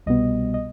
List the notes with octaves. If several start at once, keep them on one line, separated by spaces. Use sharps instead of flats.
C2 B2 G3 B3 D#5
D#5